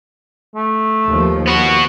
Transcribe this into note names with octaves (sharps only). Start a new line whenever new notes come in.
A3
D#2 F3
B3 F#4